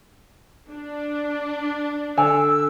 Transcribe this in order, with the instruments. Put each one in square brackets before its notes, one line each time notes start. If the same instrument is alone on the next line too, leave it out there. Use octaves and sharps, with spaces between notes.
[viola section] D4
[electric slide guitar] D3 [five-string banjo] G#5 [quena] E6